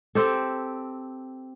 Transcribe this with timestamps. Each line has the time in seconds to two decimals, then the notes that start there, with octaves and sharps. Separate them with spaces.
0.15 C4 G4 A4